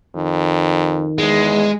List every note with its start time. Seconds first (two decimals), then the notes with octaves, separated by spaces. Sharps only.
0.16 F2 D#3
1.18 E2 G#3